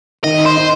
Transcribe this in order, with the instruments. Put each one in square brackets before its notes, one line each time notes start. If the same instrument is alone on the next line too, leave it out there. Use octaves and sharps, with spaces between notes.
[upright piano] D#3 [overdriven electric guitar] D#5
[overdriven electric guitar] C5
[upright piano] D#4